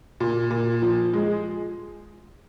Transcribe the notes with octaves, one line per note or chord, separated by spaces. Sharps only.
A#2
A#2
F3
G#3